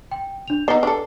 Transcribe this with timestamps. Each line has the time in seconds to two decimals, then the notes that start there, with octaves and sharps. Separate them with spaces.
0.12 G5
0.48 D4 F7
0.68 B3 D#4 B4 C7 G7
0.83 D4 A4